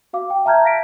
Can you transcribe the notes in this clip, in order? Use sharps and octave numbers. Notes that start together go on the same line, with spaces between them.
F#4 F5 D6
G5
E5 A5 A#5 F6 G6 G#6
F5 A#6 B6 D7